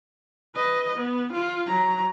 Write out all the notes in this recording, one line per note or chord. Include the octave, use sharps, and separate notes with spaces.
B4 D#5
B3
F4
F#3 A#5